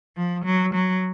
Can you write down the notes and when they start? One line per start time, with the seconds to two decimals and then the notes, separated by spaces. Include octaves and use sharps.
0.17 F3
0.45 F#3
0.74 F#3